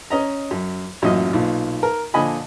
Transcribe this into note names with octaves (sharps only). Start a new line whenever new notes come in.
C#4 D#5 A#5
F#2
A1 F#2 A#2 F#3 D#5
B1 A#2
A#4
A#2 D3 F3 D#5 G#5 B5